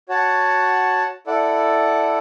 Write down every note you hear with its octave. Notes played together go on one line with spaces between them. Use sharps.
F#4 C#5 F#5 A5
E4 A4 D5 F#5